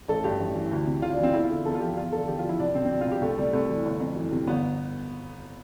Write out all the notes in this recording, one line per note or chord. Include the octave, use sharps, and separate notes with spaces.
A1 A4
G2 G4
A1
E3
D2
C3
D2 F4
D4
E3 C4
E2 E4
F4
D3
E2 A4
F4
F3 G4
E2 F4
D3 A4
E2 G4
F3 F4
E4
C2 D4
B2 C4
C4
B2 D4
F4
C2
G4
C2 A3
C3 G3
C2 A3
E3
G1
F2
E3
C3
G1 B3